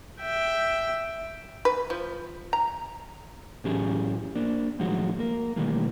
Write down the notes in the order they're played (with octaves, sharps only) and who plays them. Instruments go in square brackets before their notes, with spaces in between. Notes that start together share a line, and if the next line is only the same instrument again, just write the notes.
[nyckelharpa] E5 G5
[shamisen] B4
F3
A#5
[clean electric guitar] A2 E3 F#3 C#4 G4 G#4
A#3 D4
A2 D#3 F3 F#3 G#3 F#4
A#3 A#4
B2 D#3 E3 G3 A3 A#3